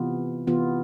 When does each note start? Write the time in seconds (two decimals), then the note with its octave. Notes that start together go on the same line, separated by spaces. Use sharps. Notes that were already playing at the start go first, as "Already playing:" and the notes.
Already playing: C3 E3 B3 F4
0.47 C3 E3 B3 F4